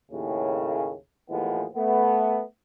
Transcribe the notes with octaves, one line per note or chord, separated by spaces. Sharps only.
D#2 A2 C#3
D#2 A2 E3 F3 G#3 B3
A3 B3